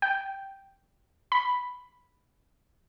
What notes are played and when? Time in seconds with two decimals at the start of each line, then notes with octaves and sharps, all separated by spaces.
0.02 G5
1.32 B5